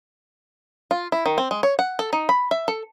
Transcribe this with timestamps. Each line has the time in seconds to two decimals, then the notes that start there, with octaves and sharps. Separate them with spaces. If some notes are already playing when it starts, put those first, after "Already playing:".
0.91 F4
1.12 E4
1.26 D#3
1.38 C4
1.51 G#3
1.63 C#5
1.79 F#5
1.99 A4
2.13 D#4
2.29 B5
2.51 E5
2.68 A4